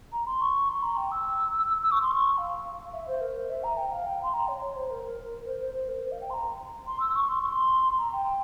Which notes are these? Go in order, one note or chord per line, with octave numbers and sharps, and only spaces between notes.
A#5
C6
C#6
C6
A#5
G5
E6
E6
C#6
C6
C#6
F5
F5
E5
C5
A#4
C5
E5
A#5
G5
F5
G5
C6
A#5
C#5
C#5
C5
A#4
A#4
C5
C5
C5
A#4
C5
F5
G5
C6
A#5
C6
E6
C#6
C6
C#6
C6
A#5
G5